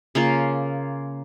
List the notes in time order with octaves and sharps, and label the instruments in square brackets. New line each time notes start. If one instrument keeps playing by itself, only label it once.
[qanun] C#3 A#3 F4